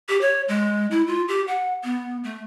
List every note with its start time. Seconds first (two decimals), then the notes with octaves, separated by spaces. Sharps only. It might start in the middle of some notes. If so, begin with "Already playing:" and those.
0.09 G4
0.21 C#5
0.49 G#3
0.91 E4
1.07 F4
1.28 G4
1.48 F#5
1.84 B3
2.24 A3